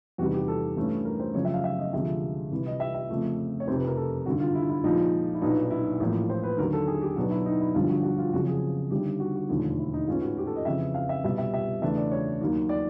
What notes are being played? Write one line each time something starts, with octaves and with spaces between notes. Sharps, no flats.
E2 C3 D#3 G3 F#4
G4
A4
G2 E3 A3 C#4
A#4
C5
F#2 C#3 F3 C#5
E5
F5
E5
D#5
D2 C3 F3 G#3 E5
C2 C3 E3
D#5
E5
E5
F2 C#3 F3 A3
C#5
F1 F2 C3 C5
B4
A#4
A4
G#1 G2 D3 F#4
F4
E4
E4
A#1 A#2 F3 G#3 D#4
E4
B1 A#2 F#3 B3 D4 D#4
E4
A1 A2 F3 A#3
C5
B4
D#2 D3 F#3 A#4
A4
G#4
G4
B1 B2 F#3 B3 D4 F#4
E4
D#4
E4
G1 G2 D3 F3 F4
F#4
F#4
F4
F#1 F2 C#3 F3 F#4
G#4
G1 G2 D#3 G4
F#4
F#4
E1 D#2 D3 F3 A3
E4
D#4
A1 G#2 E3 G#3 C#4 F4
F#4
G4
A4
D#5
F2 C#3 E3 E5
F5
E5
C2 B2 G3 E5
E5
E5
E2 C#3 E3 A3 D4 E5
D5
C#5
D#2 D#3 F#3 A#3
D5